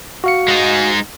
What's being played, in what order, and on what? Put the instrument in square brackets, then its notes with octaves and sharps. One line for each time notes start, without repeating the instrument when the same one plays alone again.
[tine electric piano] F#4 F5 C#7
[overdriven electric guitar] G#3 D#4